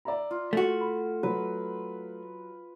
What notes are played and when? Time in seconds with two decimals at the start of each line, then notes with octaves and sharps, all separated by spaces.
0.05 D5 E5 A#5
0.31 F4
0.53 A3 F#4
0.81 B5
1.23 F#3 B4